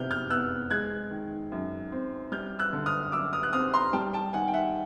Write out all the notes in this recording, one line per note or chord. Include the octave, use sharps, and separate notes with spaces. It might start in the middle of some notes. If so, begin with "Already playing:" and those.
Already playing: C3 E3 F6 G6
F6 G6
B3 E6 F#6
G#3 F#6 G#6
D#3
F#2
C4
G3 F6 G6
E6 F#6
D3
D#6 F6
F#2 D6 E6
D#6 F6
F#6
C4 D#6 F6
A#5 C6
G3 G5 A5
G5 A5
D#3 F#5 G#5
G5
E5 F#5